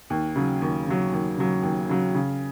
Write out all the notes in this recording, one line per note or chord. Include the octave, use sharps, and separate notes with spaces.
D#2
C#3 F#3
D#2
C#3 F#3
D#2
C#3 F#3
D#2
C#3 F#3
C#3